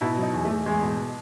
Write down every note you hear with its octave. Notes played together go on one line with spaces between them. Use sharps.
B2 E4
F#3 D#4
E2
A3
E2
E2 G#3
B2